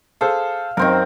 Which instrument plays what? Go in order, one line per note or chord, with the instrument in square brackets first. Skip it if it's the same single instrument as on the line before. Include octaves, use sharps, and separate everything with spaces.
[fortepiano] G#4 A4 C5 [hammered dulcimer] F5
[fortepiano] F#2 [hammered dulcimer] D#3 C4 A#4